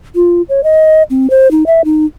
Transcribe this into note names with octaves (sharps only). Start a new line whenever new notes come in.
F4
C#5
D#5
C4
C5
D#4
E5
D#4